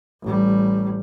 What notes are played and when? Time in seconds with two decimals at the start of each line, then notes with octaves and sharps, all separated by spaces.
0.23 A1 G3